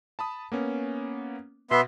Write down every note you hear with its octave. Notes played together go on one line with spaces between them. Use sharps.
A5 B5 D#6
A#3 B3 C#4
B2 B3 E5 C6